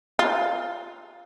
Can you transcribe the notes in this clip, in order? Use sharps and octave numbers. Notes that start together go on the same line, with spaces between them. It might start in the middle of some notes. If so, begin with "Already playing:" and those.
F4